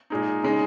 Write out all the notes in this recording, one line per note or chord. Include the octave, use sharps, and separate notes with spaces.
A#2 G#3 D#4
C#3 G#3 D#4